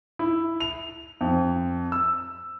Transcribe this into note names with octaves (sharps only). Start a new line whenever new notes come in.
E4
F7
F2
E6